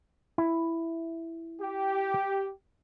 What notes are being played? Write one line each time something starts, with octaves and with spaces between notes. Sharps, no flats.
E4
G4